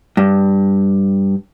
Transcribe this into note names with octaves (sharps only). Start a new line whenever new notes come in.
G2